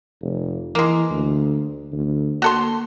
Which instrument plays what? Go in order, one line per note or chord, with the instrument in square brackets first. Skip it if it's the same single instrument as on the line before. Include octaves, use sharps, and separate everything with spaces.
[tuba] F1
[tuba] E3 [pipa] G#3 A#3
[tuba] D2
D2
[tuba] A#3 [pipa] F#4 A4 C6